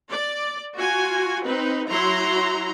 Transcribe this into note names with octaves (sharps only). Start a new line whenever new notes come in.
D5
F4 F#4 G#5
C4 D#4 B4
F#3 E4 A#5 C6